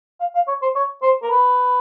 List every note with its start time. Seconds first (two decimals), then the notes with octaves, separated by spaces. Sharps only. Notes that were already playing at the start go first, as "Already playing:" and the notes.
0.20 F5
0.35 F5
0.48 C#5
0.62 C5
0.75 C#5
1.02 C5
1.23 A#4
1.31 B4